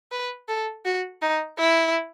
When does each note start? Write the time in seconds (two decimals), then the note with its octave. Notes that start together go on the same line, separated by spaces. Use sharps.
0.12 B4
0.49 A4
0.86 F#4
1.22 D#4
1.58 E4